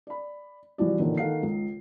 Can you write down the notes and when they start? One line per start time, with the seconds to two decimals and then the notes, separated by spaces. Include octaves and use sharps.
0.07 D5 B5
0.78 C2 E3 F3 F#4 D5
0.99 A1 A#2 D3 D#3
1.17 D#3 A4 F5 F#5 C7
1.43 C#2